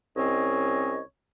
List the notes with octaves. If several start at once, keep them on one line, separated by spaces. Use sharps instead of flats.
C2 C4 C#4 C#5 D#5